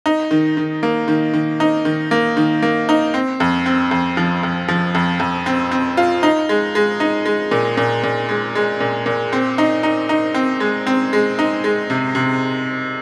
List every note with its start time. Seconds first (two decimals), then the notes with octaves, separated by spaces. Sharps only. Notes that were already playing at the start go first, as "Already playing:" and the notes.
0.06 D#4
0.31 D#3
0.57 D#3
0.83 A#3
1.08 D#3
1.34 D#3
1.60 D#4
1.85 D#3
2.11 A#3
2.37 D#3
2.62 A#3
2.89 D#4
3.14 C4
3.40 F2
3.66 C4
3.91 F2
4.17 F3
4.43 F2
4.68 F3
4.95 F2
5.20 F2
5.46 C4
5.71 C4
5.97 F4
6.23 D#4
6.49 G#3
6.75 G#3
7.00 D#4
7.25 G#3
7.51 A#2
7.77 A#2
8.03 A#2
8.29 G#3
8.55 G#3
8.80 A#2
9.06 A#2
9.33 C4
9.58 D#4
9.83 D#4
10.09 D#4
10.34 C4
10.60 G#3
10.87 C4
11.13 G#3
11.39 D#4
11.64 G#3
11.90 C3
12.15 C3